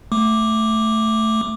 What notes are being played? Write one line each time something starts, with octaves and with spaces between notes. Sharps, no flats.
A3 D6